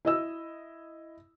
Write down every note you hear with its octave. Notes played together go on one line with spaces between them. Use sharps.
E4 D#5 E6